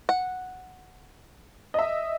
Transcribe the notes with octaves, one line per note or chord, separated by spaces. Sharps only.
F#5
D#5 E5